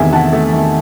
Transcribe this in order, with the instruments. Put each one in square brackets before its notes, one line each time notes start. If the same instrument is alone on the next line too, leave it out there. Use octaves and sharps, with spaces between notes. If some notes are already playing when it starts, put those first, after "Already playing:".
Already playing: [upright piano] E2 C3 D#3 A3 E5 G#5
C3 F#5 A5
A3
D#3